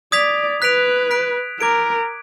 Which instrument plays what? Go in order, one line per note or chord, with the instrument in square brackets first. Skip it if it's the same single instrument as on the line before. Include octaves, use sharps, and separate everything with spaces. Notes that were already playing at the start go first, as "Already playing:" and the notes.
[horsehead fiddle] D5 [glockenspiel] D#6 G#6 B6 F7
[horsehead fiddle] B4 [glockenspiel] F#6 B6 D7 F7
[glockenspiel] F#6 B6 D7
[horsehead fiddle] A#4 [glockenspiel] D6 G#6 D7